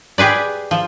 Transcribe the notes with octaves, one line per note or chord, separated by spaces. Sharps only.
G4 G#4 B4 D5
F3